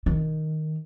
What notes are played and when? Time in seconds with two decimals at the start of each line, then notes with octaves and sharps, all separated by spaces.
0.06 D#3